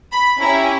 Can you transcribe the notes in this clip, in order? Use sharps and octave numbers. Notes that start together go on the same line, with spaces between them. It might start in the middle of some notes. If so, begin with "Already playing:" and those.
B5
C#4 E4 G4 A#5